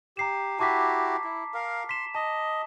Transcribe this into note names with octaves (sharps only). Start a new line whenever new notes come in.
G4 A#5 C7 E7
E4 F#4 G4 A5 D6 B6
E4
A#4 F5
C6 B6 E7
D#5 A5